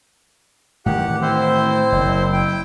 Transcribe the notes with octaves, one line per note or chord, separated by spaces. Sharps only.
A2 D#3 E3 G4 F#5
C4 E4 C5
F#1
E4 G5